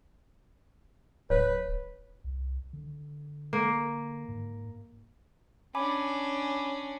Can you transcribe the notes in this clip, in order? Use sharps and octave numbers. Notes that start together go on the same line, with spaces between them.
D1 B4 C#5
C2
D3
A#3
G#2
C#4 D4 G#5 B5 D6